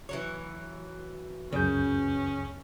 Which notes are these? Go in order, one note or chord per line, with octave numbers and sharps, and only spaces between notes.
E3 F#3 C#5
C#2 F#2 C#3 C#4 G6